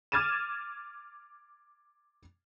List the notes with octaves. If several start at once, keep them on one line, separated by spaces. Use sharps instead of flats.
D6 F6 G#6 A6 D#7 E7